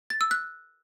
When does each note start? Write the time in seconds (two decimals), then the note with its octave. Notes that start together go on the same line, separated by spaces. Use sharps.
0.10 A6
0.21 E6
0.31 F#6